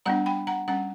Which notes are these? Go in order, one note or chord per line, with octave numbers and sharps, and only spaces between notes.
G3 B3 D4 F#5 A#5
G5 B5
F#5 A#5
G3 C#4 F#5 A#5